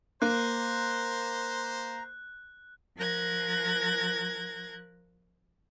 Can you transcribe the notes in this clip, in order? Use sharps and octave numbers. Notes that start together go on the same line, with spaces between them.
A#3 C5 A#5 F#6
F3 A#4 F#6 G#6 A#6